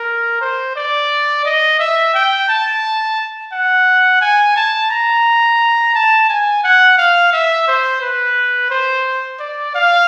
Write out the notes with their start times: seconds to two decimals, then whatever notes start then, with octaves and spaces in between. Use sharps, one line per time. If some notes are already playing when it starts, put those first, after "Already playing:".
Already playing: A#4
0.41 C5
0.76 D5
1.45 D#5
1.79 E5
2.14 G5
2.49 A5
3.52 F#5
4.21 G#5
4.56 A5
4.91 A#5
5.95 A5
6.29 G#5
6.64 F#5
6.98 F5
7.33 E5
7.68 C5
8.02 B4
8.71 C5
9.40 D5
9.75 F5